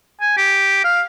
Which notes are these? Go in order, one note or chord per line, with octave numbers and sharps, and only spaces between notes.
G#5
G4
F5